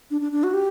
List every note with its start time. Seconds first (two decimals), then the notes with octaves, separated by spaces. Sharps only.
0.11 D4
0.21 D4
0.32 D4
0.43 F#4
0.53 G4